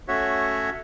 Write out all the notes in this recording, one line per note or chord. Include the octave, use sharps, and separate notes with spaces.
A3 C#4 F#4 C#5 E5 F#5